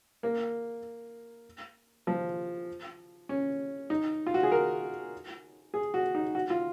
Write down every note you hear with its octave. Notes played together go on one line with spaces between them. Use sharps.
A#3
F3
C#4
D#4
F4
F#4
G#4
A#4
G#4
F#4
D#4
F#4
F4